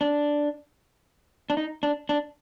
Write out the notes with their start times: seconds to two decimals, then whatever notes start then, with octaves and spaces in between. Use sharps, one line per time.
0.01 D4
1.50 D4
1.57 D#4
1.83 D4
2.09 D4